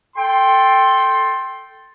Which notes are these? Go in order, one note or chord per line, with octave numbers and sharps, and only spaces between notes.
A4 G5 C6